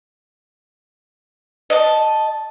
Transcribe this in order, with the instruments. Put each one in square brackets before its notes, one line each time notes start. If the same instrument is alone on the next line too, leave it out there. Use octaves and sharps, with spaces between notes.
[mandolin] D#5 A5